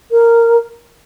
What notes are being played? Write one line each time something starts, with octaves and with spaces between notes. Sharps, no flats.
A#4